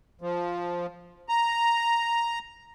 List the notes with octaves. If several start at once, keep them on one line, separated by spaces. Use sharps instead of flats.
F3
A#5